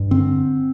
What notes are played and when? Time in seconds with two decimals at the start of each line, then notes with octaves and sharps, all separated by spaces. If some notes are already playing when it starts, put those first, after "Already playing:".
Already playing: G2
0.11 D3 C4